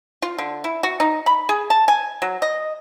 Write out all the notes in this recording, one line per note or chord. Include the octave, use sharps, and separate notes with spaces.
F4
D3
E4
F#4
D#4
B5
G#4
A5
G#5
F#3
D#5